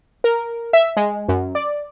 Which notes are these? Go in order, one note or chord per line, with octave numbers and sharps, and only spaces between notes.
A#4
E5
G#3
F#2
D5